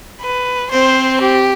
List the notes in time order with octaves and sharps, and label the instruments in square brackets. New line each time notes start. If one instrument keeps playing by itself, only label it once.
[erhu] B4
[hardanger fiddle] C4 [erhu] C5
[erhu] G4